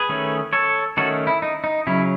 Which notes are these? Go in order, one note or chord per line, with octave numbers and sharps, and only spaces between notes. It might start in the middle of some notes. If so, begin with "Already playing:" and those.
Already playing: G#4 B4
D#3 A3 C#4
A4 C#5
D#3 A3 C#4 F#4 A4
E4
D#4
D#4
C#3 F#3 C#4 E4